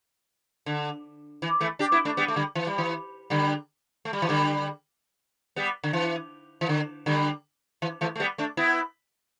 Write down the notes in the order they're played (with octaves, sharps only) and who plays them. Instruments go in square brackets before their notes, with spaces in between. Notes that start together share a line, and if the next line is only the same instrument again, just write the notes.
[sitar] D3
E3
E3 A3
D4 G4
B3 E4
A3 D4
G3 B3
A3
D3 G3
E3
G3
E3
D3 G3
A3
G3
E3
D3 G3
G3 B3
D3
E3
E3
D3
D3 G3
E3
E3 A3
A3
G3 B3
A3 D4
B3 E4